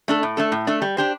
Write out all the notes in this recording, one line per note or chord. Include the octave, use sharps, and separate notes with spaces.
A3 D4 A4
A2
A3 D4 A4
A2
A3 D4 A4
G3
D4 G4 C5